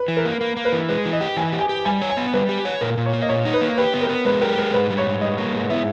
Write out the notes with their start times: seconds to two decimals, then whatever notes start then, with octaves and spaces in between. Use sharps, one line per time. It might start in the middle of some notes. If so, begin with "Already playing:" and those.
Already playing: B4
0.08 E3
0.17 A#4
0.25 A#3
0.41 A#3
0.57 A#3
0.65 B4
0.72 E3
0.89 G#3 B4
1.05 E3
1.13 D#5
1.21 G4
1.37 E3 G#5
1.52 G4
1.61 G#5
1.69 G4
1.85 G3 G#5
2.02 C#5
2.10 G#5
2.17 B3
2.33 G3 B4
2.49 G4
2.65 C#5
2.81 A#2 A#4
2.97 A#2
3.06 C#5
3.13 A#3
3.22 D#5
3.29 A#2 C#5
3.45 D#4
3.54 B4
3.61 A#3
3.78 G4 B4
3.94 B3
4.01 A#4
4.09 B3
4.25 G#3 B4
4.41 G4 A#4
4.58 G#3 A#4
4.74 G#2 B4
4.90 G3
4.98 C#5
5.06 G#2
5.21 G3 D#5
5.37 A#3
5.54 G#2
5.70 B3 E4